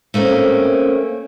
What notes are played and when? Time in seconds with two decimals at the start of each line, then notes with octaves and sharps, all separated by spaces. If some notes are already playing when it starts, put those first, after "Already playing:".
0.14 A3 A#3 C4 C#4